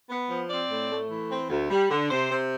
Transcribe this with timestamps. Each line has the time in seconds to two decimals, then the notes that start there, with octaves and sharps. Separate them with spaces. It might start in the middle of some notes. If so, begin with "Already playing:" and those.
0.10 B3
0.29 F3
0.49 C4 D5
0.71 A2
0.90 A3
1.10 E3
1.31 C4
1.50 D2
1.71 G3
1.90 D3
2.10 C3 C5
2.31 C3